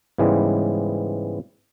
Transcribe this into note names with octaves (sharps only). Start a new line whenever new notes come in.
G#2 C#3 E3 G3 G#3 B3